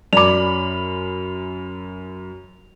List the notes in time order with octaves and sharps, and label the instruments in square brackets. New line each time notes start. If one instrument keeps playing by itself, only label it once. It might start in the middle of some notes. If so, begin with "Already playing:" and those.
[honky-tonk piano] F#2 B5 [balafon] D5 D6 [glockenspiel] F7